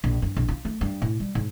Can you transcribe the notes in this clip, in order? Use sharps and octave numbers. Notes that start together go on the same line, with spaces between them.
A#1
G2
A#1
F4
A3
G2
A2
G3
G#2